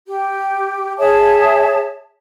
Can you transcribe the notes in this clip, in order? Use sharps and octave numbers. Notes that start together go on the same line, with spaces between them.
G4
G#4 C#5 E5 A5